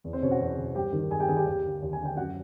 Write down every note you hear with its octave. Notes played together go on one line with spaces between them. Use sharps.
E2
C4 C5
B2 C#4 C#5
F#4 F#5
E2
B2
G2 G4 G5
D#3
G2 G#4 G#5
G4 G5
D#3 G#4 G#5
G4 G5
D#2
D3
D#2
G#5
D3
G5
F#2 F#4 F#5